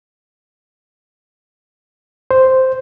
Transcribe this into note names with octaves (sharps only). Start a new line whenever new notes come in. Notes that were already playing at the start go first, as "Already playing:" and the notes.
C5